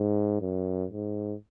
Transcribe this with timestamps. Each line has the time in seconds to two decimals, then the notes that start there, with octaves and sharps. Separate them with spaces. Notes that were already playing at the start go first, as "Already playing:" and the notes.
Already playing: G#2
0.41 F#2
0.90 G#2